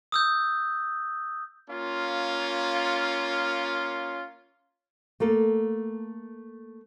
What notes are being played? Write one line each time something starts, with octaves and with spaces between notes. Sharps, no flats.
D#6 E6 G6
A#3 C#4 F4
A3 A#3 A4